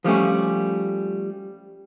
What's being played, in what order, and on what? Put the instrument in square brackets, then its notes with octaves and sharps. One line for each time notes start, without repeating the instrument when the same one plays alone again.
[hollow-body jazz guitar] F3 G3 A3 C#4